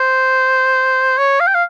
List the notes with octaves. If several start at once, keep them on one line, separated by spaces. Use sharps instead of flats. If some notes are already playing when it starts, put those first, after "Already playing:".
Already playing: C5
C#5
F5
G5
F5